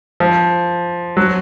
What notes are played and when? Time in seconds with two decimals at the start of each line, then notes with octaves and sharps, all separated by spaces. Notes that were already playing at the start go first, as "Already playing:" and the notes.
0.20 F3
1.17 F#3